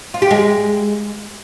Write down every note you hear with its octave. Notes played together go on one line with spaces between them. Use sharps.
F4
G4
G#3